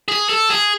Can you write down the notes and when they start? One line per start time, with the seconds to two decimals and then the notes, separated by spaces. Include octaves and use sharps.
0.08 G#4
0.29 A4
0.50 G#4